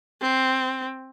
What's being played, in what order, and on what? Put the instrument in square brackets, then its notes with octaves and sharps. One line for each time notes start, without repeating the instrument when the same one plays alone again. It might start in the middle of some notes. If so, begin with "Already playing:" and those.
[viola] C4